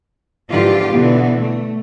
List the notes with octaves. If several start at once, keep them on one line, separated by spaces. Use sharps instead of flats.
G#2 D3 E3 F3 F4 G4
B2 D3 E3 B3
A3